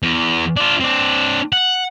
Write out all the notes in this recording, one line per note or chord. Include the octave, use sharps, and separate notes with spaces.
E2
D4 F4
C4 D4
F#5